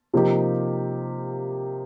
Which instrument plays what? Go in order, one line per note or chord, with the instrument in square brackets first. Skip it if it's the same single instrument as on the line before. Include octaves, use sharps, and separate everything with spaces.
[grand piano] C3 F3 A#3 D#4 G4